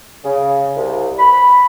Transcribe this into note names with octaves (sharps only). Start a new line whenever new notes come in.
C#3
C2
B5